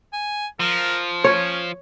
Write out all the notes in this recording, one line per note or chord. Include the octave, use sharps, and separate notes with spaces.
G#5
F3 A#4
C#4 C#5